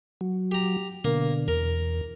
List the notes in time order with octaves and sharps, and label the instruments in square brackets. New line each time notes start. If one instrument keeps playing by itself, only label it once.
[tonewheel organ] F#3
[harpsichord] G4 A#5
[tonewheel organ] B2 D3 [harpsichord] A#3
[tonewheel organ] E2 [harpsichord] A#4